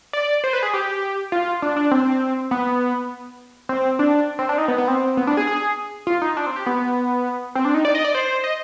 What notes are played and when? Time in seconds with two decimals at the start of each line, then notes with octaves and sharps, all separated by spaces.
0.13 D5
0.44 C5
0.53 B4
0.63 G#4
0.73 G4
1.32 F4
1.62 D4
1.77 D4
1.91 C4
2.51 B3
3.69 C4
3.99 D4
4.39 C4
4.49 D4
4.58 D#4
4.68 B3
4.78 B3
4.88 C4
5.17 B3
5.27 D4
5.37 G#4
5.47 G#4
6.07 F4
6.22 D#4
6.37 D4
6.47 C4
6.56 G4
6.66 B3
7.55 C4
7.65 D4
7.74 D#4
7.85 D5
7.95 D#5
8.04 D5
8.15 C5
8.44 D#5